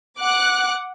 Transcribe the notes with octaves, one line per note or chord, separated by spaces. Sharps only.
F#5 D6 F#6